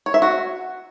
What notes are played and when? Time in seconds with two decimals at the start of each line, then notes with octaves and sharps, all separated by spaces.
0.06 C#5
0.14 E5
0.22 F#4